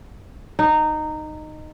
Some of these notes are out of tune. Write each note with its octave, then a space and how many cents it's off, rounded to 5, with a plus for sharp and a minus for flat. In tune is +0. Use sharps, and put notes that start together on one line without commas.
D#4 -15